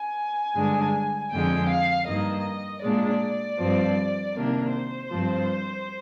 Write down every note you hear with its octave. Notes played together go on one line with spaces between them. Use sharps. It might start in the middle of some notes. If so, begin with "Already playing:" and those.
Already playing: G#5
G2 D3 G#3 D4
F2 D3 G#3 G5
F5
G2 D#3 A#3 D#5
A#2 G#3 D4 D5
G2 F3 C4
C3 D#3 A#3 D4 A#4
C5
G2 F3 C4